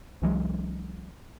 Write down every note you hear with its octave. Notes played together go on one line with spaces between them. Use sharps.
C2 E3 F#3 G#3